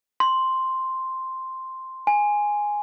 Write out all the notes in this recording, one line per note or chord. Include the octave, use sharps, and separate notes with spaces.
C6
G#5